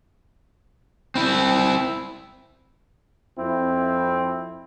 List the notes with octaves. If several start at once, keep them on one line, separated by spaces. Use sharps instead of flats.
C4 E4
F2 C4 E4